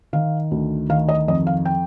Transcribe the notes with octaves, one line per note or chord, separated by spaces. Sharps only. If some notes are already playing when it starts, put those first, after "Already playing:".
D#3 F5
D2
D#3 F5
D#5
F2 D#5
F5
G5